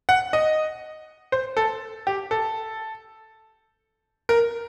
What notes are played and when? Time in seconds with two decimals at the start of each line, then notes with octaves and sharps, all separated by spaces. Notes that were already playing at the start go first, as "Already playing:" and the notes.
0.09 F#5
0.33 D#5
1.32 C5
1.57 A4
2.07 G4
2.31 A4
4.29 A#4